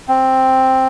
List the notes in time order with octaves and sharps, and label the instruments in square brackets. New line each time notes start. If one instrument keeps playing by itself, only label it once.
[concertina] C4